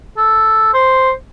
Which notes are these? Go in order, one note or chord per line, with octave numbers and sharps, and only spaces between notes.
A4
C5